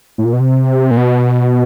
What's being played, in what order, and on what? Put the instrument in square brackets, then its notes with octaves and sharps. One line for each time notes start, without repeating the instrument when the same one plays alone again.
[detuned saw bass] A2
A#2
B2
C3
A#2
B2